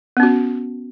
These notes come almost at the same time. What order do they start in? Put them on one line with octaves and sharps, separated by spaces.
B3 C#4 F#4